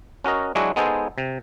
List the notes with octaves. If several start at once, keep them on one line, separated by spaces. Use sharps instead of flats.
C#4 F#4 A#4 D#5
F#3 G#3 D4 E4 F#4 G#4
G#3 B3 D#4 G#4 A4 C5
C3